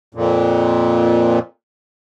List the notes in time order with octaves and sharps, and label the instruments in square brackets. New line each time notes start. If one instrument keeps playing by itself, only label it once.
[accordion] F2 A#2